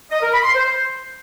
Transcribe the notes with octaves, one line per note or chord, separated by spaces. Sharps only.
D#5
A#4
B5
C6
C5